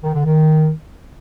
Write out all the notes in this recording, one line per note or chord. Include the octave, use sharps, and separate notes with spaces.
D#3
D3
D#3